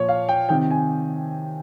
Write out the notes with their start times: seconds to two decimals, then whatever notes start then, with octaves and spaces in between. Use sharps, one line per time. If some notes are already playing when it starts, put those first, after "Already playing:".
Already playing: A#2 F3 C#5
0.09 F5
0.29 G5
0.49 C3 D#3 G5
0.71 G#5